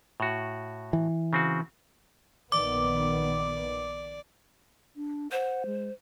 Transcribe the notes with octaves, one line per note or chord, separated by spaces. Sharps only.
A2 F#4
E3
C#3 C4 F#4
A#1 D#3 B3 D5 D6
D4
C5 F#5
G#3